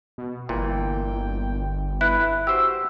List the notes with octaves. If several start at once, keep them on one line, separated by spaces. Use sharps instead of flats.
B2
G1 A#2 E3 G5
E4 B4 F#6
F#4 G4 C5 E6